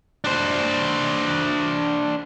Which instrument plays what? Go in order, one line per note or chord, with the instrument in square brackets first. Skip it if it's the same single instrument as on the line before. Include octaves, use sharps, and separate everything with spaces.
[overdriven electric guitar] D4 C5